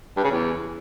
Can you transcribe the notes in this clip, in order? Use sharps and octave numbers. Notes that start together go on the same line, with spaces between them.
G2
C#3
E2